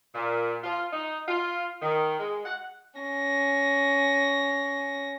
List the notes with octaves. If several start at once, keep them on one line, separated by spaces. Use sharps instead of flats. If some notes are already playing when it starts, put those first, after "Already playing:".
A#2
F4
D#4
F4
D#3
G#3
F#5
C#4 A#6